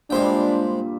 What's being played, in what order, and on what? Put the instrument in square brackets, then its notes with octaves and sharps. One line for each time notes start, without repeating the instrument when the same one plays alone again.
[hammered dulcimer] G2 A#2 G3 [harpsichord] G#3 C5 G5 [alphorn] D4